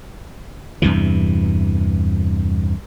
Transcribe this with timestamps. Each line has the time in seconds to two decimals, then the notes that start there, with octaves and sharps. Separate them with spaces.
0.82 E2 G2 C3 E3